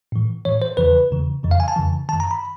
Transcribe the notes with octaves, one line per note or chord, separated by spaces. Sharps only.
A2 E3
A2 E3 C#5
C5
E2 C#3 E3 B4
E2 C#3 E3
F2 C#3 E3
F5
G#5
A5
F2 C#3 E3
F#2 D#3 A5
A#5
B5